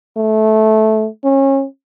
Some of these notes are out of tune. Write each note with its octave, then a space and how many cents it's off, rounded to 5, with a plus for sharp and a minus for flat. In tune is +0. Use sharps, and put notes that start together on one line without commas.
A3 -15
C#4 -30